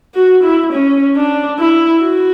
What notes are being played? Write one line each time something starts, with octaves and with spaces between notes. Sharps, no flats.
F#4
E4
C#4
D4
E4
F#4